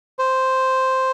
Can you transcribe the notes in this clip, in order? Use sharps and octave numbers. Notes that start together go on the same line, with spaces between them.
C5